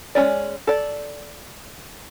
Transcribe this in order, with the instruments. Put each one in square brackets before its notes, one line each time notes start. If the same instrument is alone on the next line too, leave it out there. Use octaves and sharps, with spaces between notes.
[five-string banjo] G#3 A3 C#4 D5
A4 D5